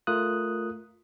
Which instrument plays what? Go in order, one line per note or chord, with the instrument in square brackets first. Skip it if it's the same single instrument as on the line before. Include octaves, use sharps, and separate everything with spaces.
[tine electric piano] A3 F4 A#4 D#6 F#6